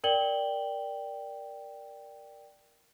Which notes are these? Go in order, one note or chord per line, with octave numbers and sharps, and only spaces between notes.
A#4 D5 G5 F#7 G7